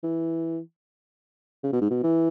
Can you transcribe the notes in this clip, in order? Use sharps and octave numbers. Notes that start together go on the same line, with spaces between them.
E3
C#3
B2
G#2
B2
E3